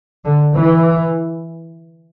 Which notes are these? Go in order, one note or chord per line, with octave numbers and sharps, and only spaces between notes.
D3
E3